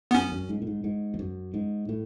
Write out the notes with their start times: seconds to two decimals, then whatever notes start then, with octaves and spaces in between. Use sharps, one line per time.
0.11 B3
0.14 F#2 C#4
0.32 F#2
0.49 G#2
0.62 A2
0.67 G#2
0.84 G#2
1.14 E2
1.19 F#2
1.54 G#2
1.89 A2